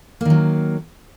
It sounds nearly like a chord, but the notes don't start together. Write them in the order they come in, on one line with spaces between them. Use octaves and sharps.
A#3 D#3 F#3